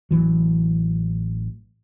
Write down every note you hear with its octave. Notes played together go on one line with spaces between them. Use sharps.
A1 E3 F#3